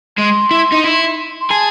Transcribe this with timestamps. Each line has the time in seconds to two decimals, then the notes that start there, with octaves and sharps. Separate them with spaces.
0.17 G#3 C6
0.51 E4
0.72 D#4
0.84 E4
1.40 C6
1.50 G#4 A5